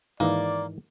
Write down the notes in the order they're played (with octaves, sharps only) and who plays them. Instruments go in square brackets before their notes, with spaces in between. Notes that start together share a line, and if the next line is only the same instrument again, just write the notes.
[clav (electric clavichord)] G#2 D#3 E3 [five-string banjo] A#3 [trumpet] D5